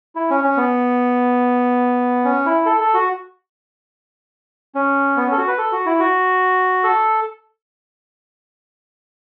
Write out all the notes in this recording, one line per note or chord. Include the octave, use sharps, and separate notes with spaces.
E4
C#4
C#4
B3
C#4
E4
A4
A4
F#4
C#4
B3
C#4 A4
F#4
B4
A4
F#4
E4
F#4
A4